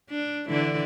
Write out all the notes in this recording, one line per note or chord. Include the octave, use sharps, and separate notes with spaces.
D4
D3 E3 D5